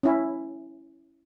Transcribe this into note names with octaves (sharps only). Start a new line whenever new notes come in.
C#4 E4